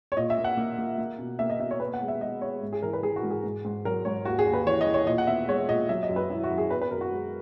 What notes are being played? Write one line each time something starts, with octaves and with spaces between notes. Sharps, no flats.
C#5
A#2 D#5
E5
A#3
F#5
A#3
A#3
A#3
B2
A#3 E5
D#5
B2 E5
C#5
B3 B4
F#5
G#3
E5
G#3 D#5
G#3 C#5
G#2
G#4
E3 A#4
B4
E3 G#4
F#4
G#2
G#4
G#2
G#2
F#3 A#4
G#2 C#5
D#2 F#4
G#4
D#2
B4
E3 C#5
D#5
E3
C#5
A#2 D#5
F#5
B3 E5
G#3 C#5
A#2 D#5
F#3 E5
D#5
F#2
B4
F#3 E4
F#4
F#2
G#4
B3 B4
B4
F#2 A#4
F#4
G#3